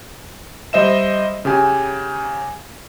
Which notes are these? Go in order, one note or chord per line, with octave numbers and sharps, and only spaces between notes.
G3 C5 D#5 E5 E7
C#3 G4 G#5